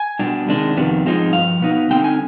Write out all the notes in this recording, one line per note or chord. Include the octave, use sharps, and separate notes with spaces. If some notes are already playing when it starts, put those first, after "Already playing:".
Already playing: G#5
B2 G3 D4
C3 D#3 G#3 D4
F2 C3 D#3 G3 B3
G#2 F3 G#3 C4 D#4
G2 F3 F5
B2 B3 D#4
D3 G3 C4 D#4 G5
G#5